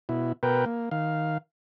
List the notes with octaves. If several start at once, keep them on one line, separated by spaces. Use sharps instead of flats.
B2 E4
B2 A#4 B4 G5
A#3
D#3 F5